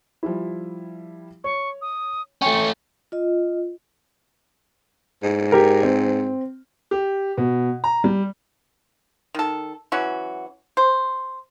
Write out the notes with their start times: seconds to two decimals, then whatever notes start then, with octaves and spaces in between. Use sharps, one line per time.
0.23 F3 G3 E4
1.44 C#5 C#6
1.82 D#6
2.42 A3 C#4 G5 G#5 C#6
3.12 F4 D#5
5.23 G#2
5.52 G4 A#4
5.83 C4
6.91 G4
7.37 B2
7.84 A#5
8.04 G3
9.35 D#3 A4
9.92 E3 F#3 C#4 F#4
10.77 C5